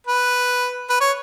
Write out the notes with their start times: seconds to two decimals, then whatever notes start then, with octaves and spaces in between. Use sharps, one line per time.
0.07 B4
0.90 B4
1.01 C#5